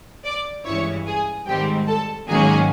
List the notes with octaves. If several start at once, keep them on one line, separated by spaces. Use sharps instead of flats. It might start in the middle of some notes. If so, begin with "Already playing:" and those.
D5 D6
G2 E3 G#3 C#4 E4 C#5 C#6
G#4 G#5
G#2 D#3 G3 C4 G4 G5
A4 A5
G#2 D#3 F#3 A#3 C#4 G#4 G#5